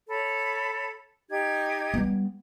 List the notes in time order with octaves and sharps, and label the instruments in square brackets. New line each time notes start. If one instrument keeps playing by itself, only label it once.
[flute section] A4 C#5 B5
D#4 G4 G#6
[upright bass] G3 B3